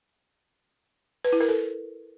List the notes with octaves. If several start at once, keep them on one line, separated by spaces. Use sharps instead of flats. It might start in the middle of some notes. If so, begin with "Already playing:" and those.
B4
E4
A#4
A4